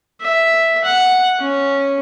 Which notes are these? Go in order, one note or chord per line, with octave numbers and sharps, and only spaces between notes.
E5
F#5
C#4